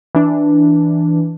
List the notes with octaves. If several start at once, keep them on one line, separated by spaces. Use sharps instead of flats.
E3 D4